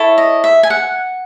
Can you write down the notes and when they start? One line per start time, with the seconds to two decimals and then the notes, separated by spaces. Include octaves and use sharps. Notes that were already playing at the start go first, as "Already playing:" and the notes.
Already playing: E4 A4 C#5
0.18 D#5
0.44 E5
0.63 G#5
0.70 F#5